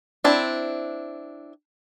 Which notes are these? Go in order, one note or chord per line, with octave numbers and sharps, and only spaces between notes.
C4 D4 E4